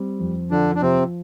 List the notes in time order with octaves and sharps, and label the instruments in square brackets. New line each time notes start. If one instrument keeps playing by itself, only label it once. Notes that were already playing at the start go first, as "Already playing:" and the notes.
Already playing: [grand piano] G3 C4
F2
[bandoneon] D3 D4 [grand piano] F3
[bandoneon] D4
[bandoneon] C3 C4 [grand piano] F3